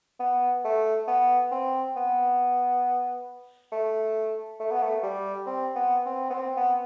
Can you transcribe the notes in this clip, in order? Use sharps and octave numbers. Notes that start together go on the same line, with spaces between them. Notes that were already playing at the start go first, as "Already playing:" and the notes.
B3
A3
B3
C4
B3
A3
A3
B3
A3
G3
C4
B3
C4
B3
C4
B3